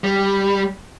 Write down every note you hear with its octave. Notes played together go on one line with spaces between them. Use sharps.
G3